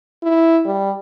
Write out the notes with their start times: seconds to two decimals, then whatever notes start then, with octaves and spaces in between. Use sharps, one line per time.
0.23 E4
0.66 G3